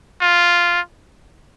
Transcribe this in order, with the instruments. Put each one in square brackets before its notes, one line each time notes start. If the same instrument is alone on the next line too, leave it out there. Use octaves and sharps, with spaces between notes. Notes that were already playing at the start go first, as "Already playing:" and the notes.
[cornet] F4